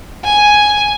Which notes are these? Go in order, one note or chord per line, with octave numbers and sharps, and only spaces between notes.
G#5